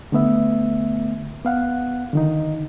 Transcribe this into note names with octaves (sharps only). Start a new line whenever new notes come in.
D3 A3 B3 E5
B3 F5 F#5
D3 D#3 D#4